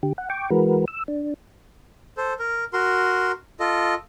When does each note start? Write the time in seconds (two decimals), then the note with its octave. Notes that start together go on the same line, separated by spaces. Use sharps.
0.03 D3 G4
0.18 F#5
0.30 G5 C#6 D6
0.50 E3 G#3 F#4 A#4 B4
0.88 E6
1.08 D4
2.17 A4 C5
2.39 A#4
2.73 F#4 A#4 C6
3.60 F4 A4 D#5